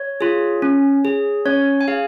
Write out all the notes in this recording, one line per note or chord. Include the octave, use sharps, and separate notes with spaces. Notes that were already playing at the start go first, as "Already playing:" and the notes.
Already playing: C#5
F4 G#4
C#4
G#4
C#4 C#5
G#5
G#4 F5